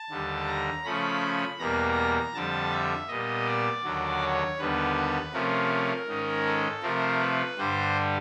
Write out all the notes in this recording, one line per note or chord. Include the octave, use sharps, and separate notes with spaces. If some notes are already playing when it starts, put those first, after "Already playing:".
Already playing: A5
D#2 D3 G3
A#5
C#3 F3 A3 C#4 B5
E2 B2 G3 A#3 A#5
F2 D3 G3 A5
E5
A#2 G3 B3 D#5
D5
D#2 D3 F#3
C#5
D#2 D3 G3 B3 B4
C3 F3 A3 C#4 A#4
G#2 D#3 G#3 C#4
A4
C3 F3 A3 C4 A#4
B4
G2 D3 G3 C5